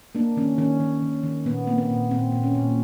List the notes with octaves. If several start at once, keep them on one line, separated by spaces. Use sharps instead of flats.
A#3 D4
D#3 C#4
D#3 C#4
D#3
D#3
D#3
A#2 B3
A#3 C4
B3
A#2
A#2 C4
A#2
C#4
A#2